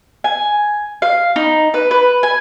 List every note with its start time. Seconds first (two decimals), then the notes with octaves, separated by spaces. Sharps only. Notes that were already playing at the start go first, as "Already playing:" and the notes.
0.24 G#5
1.02 F5
1.36 D#4
1.74 B4
1.91 B4
2.23 G#5